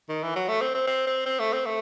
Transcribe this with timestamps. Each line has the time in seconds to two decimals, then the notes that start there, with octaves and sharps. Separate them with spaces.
0.09 D#3
0.23 E3
0.36 F#3
0.48 A3
0.61 C4
0.74 C4
0.87 C4
1.07 C4
1.26 C4
1.39 A3
1.53 C4
1.66 A3